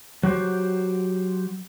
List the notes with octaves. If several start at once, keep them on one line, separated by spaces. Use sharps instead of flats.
F#3 F#4 G4 C5